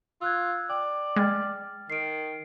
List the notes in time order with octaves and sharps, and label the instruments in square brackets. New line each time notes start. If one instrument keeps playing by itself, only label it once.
[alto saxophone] F4 [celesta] E6 F#6 G#6
[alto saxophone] D5 [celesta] G5
[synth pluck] G#3 [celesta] G5 F6 A6
[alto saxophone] D#3 [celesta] C7 D7